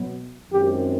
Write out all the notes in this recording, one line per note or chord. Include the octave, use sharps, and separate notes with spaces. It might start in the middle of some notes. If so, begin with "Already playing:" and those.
Already playing: B2 F#3 B3
F#2 D#3 G#3 C4 G4